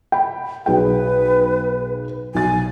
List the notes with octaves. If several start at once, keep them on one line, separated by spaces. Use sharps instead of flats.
G5 B5
B1 G#4 B4 G5
B1 G#5 A6